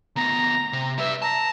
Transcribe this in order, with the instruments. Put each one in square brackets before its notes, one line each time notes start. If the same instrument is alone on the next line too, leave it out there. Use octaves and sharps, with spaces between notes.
[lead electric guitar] D2 B3 [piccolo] A#5
[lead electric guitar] C3
[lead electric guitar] G3 B4 [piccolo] E5
[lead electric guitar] A5 [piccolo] A#5